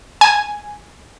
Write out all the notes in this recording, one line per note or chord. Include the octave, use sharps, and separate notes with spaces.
G#5